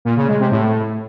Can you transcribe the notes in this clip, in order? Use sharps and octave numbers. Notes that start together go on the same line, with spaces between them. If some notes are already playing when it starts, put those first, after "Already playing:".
A#2
C#3
G#3
C3
A2